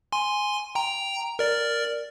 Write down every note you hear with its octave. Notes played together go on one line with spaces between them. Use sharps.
G#5 C6
G5 A#5
A#4 D5